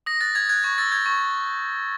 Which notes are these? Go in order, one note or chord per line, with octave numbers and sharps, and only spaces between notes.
D#6 A#6
F#6 A6
D#6 G#6
F#6 G#6
C#6 G#6
E6 A6
G6 G#6
C#6